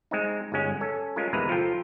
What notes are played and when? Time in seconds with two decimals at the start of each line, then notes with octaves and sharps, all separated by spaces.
0.11 G#3 C4 D#4
0.52 G1 G#2 G#3 C#4 F#5
0.81 C#4 A4 G#5
1.16 G#3 C#4 F4 A#4
1.33 E2 C3 D#3 G#3 B4 A#5
1.49 F3 F4 A4 G5 A#5